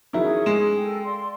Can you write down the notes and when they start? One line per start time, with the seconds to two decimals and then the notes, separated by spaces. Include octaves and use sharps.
0.13 D#3 F#3 C#4 E4 G#4
0.46 G#3 E7
0.78 A4 A#4 G5
1.04 D5 F5 C6